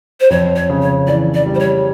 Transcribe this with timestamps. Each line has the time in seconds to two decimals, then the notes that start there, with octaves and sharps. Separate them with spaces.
0.20 C5
0.30 F2 C#5
0.56 C#5
0.69 C#3
0.82 C#5
1.07 E3 D5
1.34 D5
1.46 G3
1.55 C5
1.59 C#5